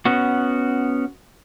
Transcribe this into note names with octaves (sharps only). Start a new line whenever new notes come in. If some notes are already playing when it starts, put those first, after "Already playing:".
B3 C#4 F#4